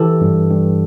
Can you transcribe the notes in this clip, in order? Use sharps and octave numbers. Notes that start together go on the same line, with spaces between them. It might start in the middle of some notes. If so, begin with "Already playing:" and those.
Already playing: E3 G4 A4
G2
G2